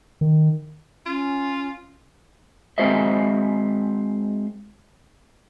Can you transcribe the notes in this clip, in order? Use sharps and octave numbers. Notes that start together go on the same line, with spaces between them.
D#3
C#4 F4
G#3 C4 F#4 C5 D#5 E5